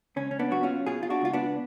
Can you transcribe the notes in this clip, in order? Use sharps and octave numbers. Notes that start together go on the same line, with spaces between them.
C#2 C#4
C#4
B3 D4
F#3 F#4
C#4 F4
B2 F4 G#4
F4
D4 F#4
C#2 F4
B3 D4